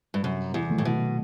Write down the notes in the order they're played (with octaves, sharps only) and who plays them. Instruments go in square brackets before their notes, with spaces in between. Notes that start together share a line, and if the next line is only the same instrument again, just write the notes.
[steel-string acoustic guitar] G2
[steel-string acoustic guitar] F#2 [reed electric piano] C3
[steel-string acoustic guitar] E2
[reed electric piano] D#3 F#3 A3
[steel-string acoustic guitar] A2
B2